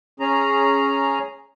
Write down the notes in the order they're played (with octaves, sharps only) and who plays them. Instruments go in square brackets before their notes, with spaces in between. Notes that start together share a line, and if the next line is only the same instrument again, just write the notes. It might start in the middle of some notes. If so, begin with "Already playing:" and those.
[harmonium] C#4 G#4 A#5